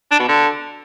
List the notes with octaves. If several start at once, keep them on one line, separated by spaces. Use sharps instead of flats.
D4
B2
D3